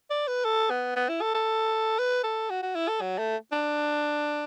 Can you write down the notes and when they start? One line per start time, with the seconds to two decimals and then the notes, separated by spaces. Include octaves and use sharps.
0.10 D5
0.28 B4
0.45 A4
0.70 B3
0.96 B3
1.09 E4
1.21 A4
1.34 A4
1.99 B4
2.24 A4
2.50 F#4
2.63 F#4
2.75 E4
2.88 A4
3.01 F#3
3.18 A3
3.52 D4